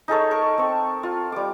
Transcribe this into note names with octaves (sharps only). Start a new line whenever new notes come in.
D#4 G#4 A4 C#5
A4 A#4 C#6
C4 C#6
F4
G3 D6